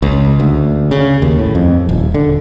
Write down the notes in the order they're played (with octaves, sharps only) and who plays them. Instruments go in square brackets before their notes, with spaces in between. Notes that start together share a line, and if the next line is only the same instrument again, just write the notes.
[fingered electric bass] C#2
D2
C#3
D#2
A2
F2
D#1
D3